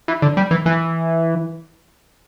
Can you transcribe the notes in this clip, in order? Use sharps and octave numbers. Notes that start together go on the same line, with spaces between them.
E3
D3
G3
E3
E3